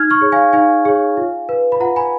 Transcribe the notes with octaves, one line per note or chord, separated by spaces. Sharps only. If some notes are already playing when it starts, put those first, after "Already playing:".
Already playing: D#4 F6 G#6
C#6 F6
G#4 C#5
F5 G#5
D#4 F5 G#5
G#4 C#5
F4
B4
B5
F4 F#5 A#5
G#5 B5